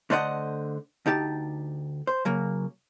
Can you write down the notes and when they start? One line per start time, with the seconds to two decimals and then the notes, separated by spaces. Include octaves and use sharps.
0.10 D3 A3 C5 D5 D#5 F#5
1.06 D2 D#4 G4 A5
2.07 C5
2.25 C#3 F#3 A#3